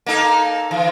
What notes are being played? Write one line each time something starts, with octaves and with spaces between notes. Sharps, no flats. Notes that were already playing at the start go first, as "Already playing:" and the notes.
A#3 D#4 A4
E3